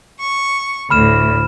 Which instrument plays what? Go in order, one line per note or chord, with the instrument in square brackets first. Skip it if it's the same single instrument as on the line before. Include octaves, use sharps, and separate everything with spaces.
[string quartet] C#6
[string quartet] D2 A2 [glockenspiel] B5 F6 E7